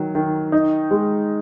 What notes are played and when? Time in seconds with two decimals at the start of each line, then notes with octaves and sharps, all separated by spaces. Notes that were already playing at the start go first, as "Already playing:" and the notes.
Already playing: D#3 F#3
0.15 D#3
0.52 D#4
0.91 G#3